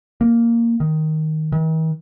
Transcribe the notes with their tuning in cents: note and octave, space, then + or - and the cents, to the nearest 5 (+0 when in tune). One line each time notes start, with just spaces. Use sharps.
A#3 -5
D#3 +5
D#3 +45